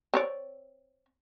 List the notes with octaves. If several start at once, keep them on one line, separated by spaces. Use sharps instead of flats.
C4 C#5 D5